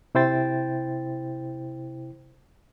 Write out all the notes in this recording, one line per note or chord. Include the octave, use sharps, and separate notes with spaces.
C3 E4 C5 G5 A6